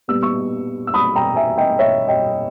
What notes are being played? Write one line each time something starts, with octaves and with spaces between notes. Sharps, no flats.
A#2 G3 B3 E6
C#6 E6
E6
B5 D#6
G5 A#5
E5 G#5
D#5 G5
C#5 E5
D#5 G5